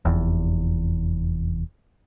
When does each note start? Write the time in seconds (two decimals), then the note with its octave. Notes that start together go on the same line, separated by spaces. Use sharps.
0.05 F1 E2